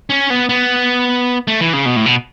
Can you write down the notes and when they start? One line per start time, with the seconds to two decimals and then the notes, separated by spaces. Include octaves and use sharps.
0.10 C#4
0.30 B3
0.49 B3
1.48 A3
1.61 E3
1.73 C#3
1.86 B2
1.96 A2
2.06 B2